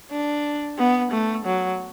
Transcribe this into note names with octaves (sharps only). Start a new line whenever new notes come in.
D4
B3
A3
F#3